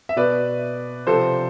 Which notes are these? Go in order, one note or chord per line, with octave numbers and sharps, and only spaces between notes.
E5
B2 B4 D5
C3 F3 A4 C5